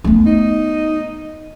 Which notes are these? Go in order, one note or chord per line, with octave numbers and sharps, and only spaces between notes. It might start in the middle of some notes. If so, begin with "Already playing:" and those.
A3 B3
D#4